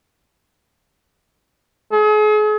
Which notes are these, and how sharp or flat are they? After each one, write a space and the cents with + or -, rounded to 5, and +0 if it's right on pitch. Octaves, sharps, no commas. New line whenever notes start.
G#4 +40